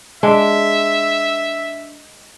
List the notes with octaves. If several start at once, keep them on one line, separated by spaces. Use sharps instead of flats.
G#3 D4 E5